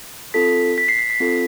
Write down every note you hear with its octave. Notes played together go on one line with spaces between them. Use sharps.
C4 F4 A4 B6
B6
C7
C7
B6
C4 F4 A4